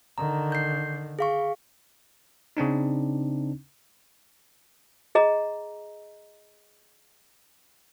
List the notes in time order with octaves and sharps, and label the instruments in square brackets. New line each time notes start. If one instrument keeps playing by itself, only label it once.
[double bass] D3 D#3 [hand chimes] A#5
[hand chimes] G6 C7
G#4 F5 C#6
[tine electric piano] C#3 C4 D4 D#4
[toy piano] G#4 D#5 A#5